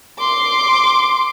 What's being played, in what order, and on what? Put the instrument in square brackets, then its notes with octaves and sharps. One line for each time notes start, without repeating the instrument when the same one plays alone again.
[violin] C6 D6